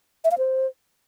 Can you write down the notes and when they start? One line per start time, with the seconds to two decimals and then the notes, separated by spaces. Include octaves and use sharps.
0.24 E5
0.31 F5
0.38 C5